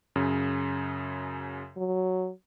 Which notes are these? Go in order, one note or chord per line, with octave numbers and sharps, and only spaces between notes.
F#2 C#3
F#3